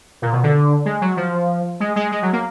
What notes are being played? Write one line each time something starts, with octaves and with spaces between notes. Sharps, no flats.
A#2
B2
D3
G#3
F#3
F3
G#3
G#3
G#3
F#3
A#3